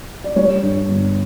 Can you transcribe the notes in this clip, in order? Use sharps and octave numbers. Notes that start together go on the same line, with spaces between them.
D5
G3 C#5
G2
G1